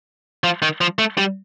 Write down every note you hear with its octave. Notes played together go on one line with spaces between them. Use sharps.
F3
D#3
F3
A3
G3